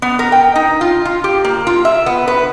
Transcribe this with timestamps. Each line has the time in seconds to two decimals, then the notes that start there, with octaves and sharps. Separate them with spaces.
0.02 B3
0.19 A#4
0.32 G5
0.56 D#4
0.81 F4
1.05 F4
1.24 G4
1.44 A#3
1.67 F4
1.85 E5
2.06 B3
2.28 B4